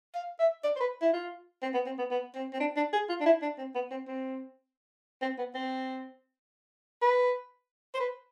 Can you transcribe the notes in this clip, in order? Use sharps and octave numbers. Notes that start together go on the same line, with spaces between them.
F5
E5
D5
C5
B4
E4
F4
C4
B3
C4
B3
B3
C4
C4
D4
D4
G#4
F4
D4
E4
D4
C4
B3
C4
C4
C4
B3
C4
B4
C5
B4